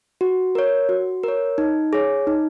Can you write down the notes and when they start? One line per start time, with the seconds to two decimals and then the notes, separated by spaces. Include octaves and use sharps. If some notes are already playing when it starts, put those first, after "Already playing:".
0.21 F#4
0.55 A#4 C#5
0.89 F#4
1.23 A#4 C#5
1.58 D#4
1.93 G#4 C#5
2.27 D#4